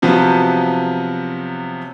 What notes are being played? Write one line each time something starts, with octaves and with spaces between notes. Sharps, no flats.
C3 F3 F#3 B3